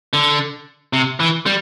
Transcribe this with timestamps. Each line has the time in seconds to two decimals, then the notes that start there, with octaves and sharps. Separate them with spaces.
0.13 D3
0.93 C3
1.20 E3
1.46 G3